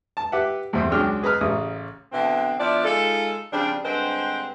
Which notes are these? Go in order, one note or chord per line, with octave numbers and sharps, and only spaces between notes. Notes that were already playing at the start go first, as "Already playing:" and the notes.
A5
G4 B4 E5 F#5
E2 G2 B2 A3 C4
C#2 F#3 G#3 D4 G5 F6
G#4 B4 D#5 A#5 B5 F6
A1 C#3 D#6
B2 D3 E3 C4
F3 B3 D4 E4 D5
G#3 D#4 F4 A4
C#3 F3 G3 C4 D4
G2 D3 G#3 C4 B4 C5